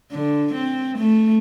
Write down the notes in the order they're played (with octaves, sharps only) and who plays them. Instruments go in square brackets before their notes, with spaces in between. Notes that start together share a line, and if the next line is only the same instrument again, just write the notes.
[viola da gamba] D3
C4
A3